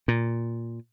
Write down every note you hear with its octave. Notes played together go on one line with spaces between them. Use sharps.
A#2